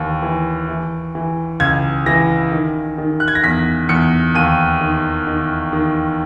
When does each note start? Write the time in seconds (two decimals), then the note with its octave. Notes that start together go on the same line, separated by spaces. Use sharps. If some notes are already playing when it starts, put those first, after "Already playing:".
Already playing: D#2 E3
0.22 E3
0.69 E3
1.15 E3
1.60 C#2 G#6
2.06 E3 A#6
2.52 D#3
2.98 D#3
3.20 F#6
3.28 G#6
3.35 A#6
3.43 E2 B6
3.89 E2 C#7
4.35 D#2 D#7
4.81 D#3
5.27 D#3
5.73 D#3